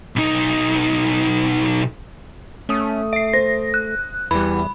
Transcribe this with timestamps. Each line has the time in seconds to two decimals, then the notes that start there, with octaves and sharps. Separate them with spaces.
0.16 B1 D#4
2.69 A3 C#4 D#6
3.13 E5 C7 D7
3.33 C5 A#6
3.74 F#6
4.31 E2 E3 G3 B5